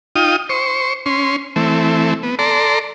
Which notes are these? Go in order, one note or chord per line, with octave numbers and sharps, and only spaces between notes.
D#4 F4 G5 D#6
C5 C#6
C#4 C6
E3 A3 C4
B3
A4 D5 A#5 C6